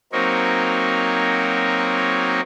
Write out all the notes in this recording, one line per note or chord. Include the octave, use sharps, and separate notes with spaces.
F#3 A#3 C4 D#4 A#4 C#5